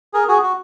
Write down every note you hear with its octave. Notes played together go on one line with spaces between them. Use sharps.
G#4 A#4
F#4 G#4
F#4